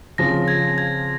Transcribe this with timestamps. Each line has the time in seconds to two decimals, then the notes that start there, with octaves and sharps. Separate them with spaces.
0.18 C#3 F3 C4 A#6
0.48 G#6
0.78 G#6